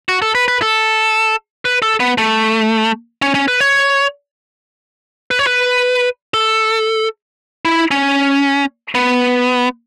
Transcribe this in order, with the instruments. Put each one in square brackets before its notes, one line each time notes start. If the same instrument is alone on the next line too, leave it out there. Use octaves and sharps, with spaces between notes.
[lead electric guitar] F#4
A4
B4
B4
A4
B4
A4
B3
A3
C#4
C#4
B4
C#5
B4
C#5
B4
A4
E4
C#4
B3